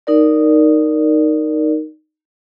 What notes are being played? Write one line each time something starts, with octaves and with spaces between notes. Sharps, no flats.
D#4 A#4 D5